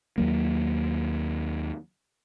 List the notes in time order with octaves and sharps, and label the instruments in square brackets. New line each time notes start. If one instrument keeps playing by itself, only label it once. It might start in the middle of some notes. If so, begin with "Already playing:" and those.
[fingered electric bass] D#2 F#3 A#3